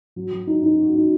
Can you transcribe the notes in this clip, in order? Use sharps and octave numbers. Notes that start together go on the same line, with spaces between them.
F#3
F#3
D#4
D#4
F#4
D#4